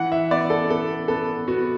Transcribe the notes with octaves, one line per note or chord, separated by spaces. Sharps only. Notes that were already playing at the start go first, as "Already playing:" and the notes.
Already playing: E3 F#5
E5
B3 D5
A4
B3 A4
B3 A4
B3 F#4